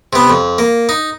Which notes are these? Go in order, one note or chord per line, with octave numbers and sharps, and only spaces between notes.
C3 B3
F2
A#3
D#4